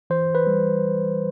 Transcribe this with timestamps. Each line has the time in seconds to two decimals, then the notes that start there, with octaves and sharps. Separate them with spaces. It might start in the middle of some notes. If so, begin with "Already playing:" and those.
0.10 E3 C5
0.35 B4
0.47 G3